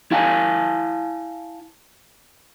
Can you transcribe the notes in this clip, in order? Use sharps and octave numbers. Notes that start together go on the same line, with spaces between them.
E4 F5 F#5 G#5 A5